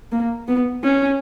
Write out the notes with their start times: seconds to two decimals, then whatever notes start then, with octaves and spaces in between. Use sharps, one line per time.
0.12 A#3
0.48 B3
0.84 C#4